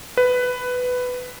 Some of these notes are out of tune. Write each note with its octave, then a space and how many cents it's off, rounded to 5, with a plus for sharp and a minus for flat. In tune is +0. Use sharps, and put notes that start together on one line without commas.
B4 +10